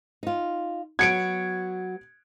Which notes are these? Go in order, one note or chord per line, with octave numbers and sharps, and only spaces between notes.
D#4 F4
F#3 B3 F#4 G#6 C#7 D7